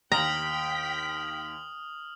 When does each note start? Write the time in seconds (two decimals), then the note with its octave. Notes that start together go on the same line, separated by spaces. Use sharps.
0.12 D#2 G5 A#5 D#6 F6 B6 F#7